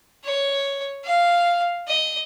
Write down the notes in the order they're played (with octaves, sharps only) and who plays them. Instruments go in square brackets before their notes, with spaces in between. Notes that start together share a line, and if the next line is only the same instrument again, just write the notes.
[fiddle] C#5
F5
D#5